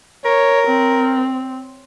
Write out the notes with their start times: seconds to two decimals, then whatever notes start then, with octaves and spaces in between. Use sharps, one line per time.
0.25 A#4 C#5
0.67 C4